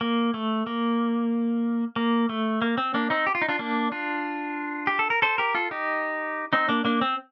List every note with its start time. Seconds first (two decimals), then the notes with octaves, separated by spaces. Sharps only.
0.01 A#3
0.34 A3
0.67 A#3
1.96 A#3
2.29 A3
2.62 A#3
2.78 C4
2.94 A#3 D4
3.10 C4 D#4
3.27 G4
3.35 F4
3.42 D#4
3.49 D4 F4
3.59 A#3 D4
3.92 D4 F4
4.87 G4
4.99 A4
5.10 A#4
5.22 A4 C5
5.38 G4 A#4
5.55 F4 A4
5.71 D#4 G4
6.53 C4 D#4
6.69 A#3 D4
6.85 A#3 D4
7.01 C4